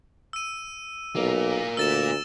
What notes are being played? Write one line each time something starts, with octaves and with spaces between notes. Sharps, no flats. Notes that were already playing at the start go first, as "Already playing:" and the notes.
E6 D#7
B1 A#3 F4
D2 E6 A6 E7